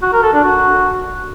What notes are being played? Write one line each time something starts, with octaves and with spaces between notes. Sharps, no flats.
F#4
A#4
A4
D4
F#4